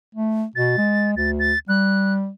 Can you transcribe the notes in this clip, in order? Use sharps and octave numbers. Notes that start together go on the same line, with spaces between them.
A3
B2 A6
G#3
D2 A6
A6
G3 F#6